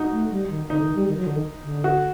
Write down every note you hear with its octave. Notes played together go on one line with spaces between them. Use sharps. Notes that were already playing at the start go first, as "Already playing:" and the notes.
Already playing: D#4 F#4
A3
G3
D#3
D3 D#4
D#3
G3
D#3
F#3
D3
D#3
D3
F#4